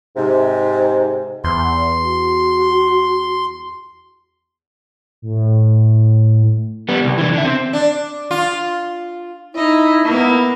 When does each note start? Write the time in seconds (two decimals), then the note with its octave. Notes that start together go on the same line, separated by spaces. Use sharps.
0.16 G#2 C3
1.44 E2 C6
2.02 F#4
5.22 A2
6.89 G3 B3
7.04 C2
7.18 E3 D4
7.33 D3 E5
7.45 C4
7.73 D4
8.31 F4
9.54 D#4 E4 D#5
10.05 A#3 B3